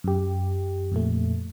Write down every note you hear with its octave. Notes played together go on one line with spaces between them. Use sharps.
F#2 G4
F2 A#2 A3